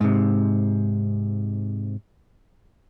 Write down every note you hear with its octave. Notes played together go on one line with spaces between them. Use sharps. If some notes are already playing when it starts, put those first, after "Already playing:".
G#2 C3